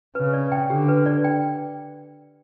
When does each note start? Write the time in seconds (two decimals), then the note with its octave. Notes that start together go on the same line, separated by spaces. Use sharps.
0.15 C#3 B4
0.33 D5
0.52 G5
0.70 D3 G4
0.88 B4
1.06 D5
1.24 G5